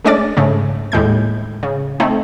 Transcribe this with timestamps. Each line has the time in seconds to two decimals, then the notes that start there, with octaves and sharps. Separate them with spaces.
0.05 G#3 A3 C#4 D4 D5 A6
0.37 G#2 C#3 A3
0.92 D#2 A2 G#3 G6
1.63 C#3
2.00 A3 C4 D#4